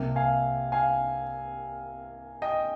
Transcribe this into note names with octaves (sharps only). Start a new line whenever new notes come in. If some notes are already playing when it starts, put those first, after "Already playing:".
Already playing: C2 C3 G3 A#3
F5 G#5
F5 G#5
D#5 G5